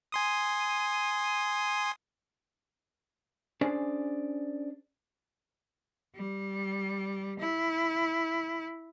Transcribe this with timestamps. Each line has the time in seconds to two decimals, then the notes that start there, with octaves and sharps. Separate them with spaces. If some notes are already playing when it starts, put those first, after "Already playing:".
0.12 G#5 C6 D#6
3.61 C#4 D4 G#4 C5 D5
6.15 G3
7.40 E4